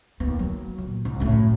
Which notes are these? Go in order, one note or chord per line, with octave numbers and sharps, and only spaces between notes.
D#2 B3
F#3
A#2
C2
F#2 A2